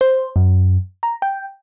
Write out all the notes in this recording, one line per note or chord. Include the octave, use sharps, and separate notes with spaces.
C5
F#2
A#5
G5